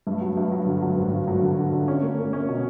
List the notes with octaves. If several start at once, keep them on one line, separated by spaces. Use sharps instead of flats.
G2
F#3
G2
F#3
D3
F#3
G#1
D3
F#3
D3
D3
D3
C#4
A#3
A#3
C#4
B2